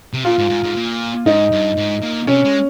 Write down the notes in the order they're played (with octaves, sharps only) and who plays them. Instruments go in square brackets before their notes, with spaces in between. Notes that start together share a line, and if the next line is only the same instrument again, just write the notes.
[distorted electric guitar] C3
[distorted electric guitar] A#2 [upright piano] F4
[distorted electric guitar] G#2
G#2
G#2
A#2
[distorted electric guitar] G#2 [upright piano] D#4
[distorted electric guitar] G2
G#2
A#2
[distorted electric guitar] C3 [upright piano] C#4
[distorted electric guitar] G#3